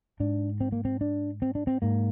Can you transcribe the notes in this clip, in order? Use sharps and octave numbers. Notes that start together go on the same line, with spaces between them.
G#2 D4
C4
A#3
C4
D4
C4
D4
C4
G#2 A#3